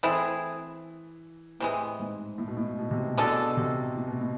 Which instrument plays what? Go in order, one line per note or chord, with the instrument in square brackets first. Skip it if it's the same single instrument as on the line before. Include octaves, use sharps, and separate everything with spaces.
[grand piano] E3 [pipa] A3 C4 E4 G#4
[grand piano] A2 [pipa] C3 E3 G#3
[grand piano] G#2
A2
B2
A2
B2
C3
B2
[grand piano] B2 [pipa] D3 G#3 D4 A4
[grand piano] C3
A2
B2
A2